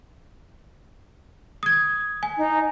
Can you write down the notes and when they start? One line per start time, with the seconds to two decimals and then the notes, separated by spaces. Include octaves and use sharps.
1.63 D#6 G#6
2.23 G#5
2.37 D#4